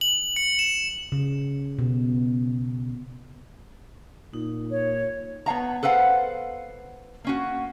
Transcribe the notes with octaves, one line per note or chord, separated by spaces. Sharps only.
F#7
C#7
E7
C#3
B2
A#2 D#4
C#5
B3 C#5 F5 A#5
A4 B4 C5 F5 F#5
A#3 C#4 F#4